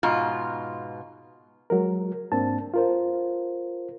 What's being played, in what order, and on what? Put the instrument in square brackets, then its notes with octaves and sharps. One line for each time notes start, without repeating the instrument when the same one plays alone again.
[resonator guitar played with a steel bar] G#2 B2 F4
[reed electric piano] F#3 G#3 A#4
G#2 A#3 C4 D4 A5
F4 A#4 C5